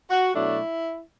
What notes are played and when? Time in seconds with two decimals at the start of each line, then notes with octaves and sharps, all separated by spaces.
0.10 F#4
0.34 B2 F#3 A3 D4 E4